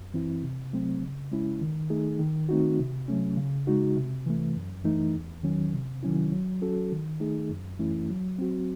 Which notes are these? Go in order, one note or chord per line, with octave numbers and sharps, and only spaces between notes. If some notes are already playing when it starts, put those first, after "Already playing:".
Already playing: F#2
E3 C4 E4
C3
F#3 A3 C4
C#3
G#3 C#4 E4
D#3
A3 D#4 G#4
D#3
A3 C4 D#4 F#4
C3
F#3 A3 C#4
C#3
G#3 D#4 F#4
C3
E3 A3
F#2
E3 A3 D#4
E2
D#3 F#3 C#4
C3
D#3 F#3 C#4 E4
F#3
C#4 F#4 A4
D#3
A3 D#4 G#4
F#2
E3 A3 C#4 E4
F#3
C4 F#4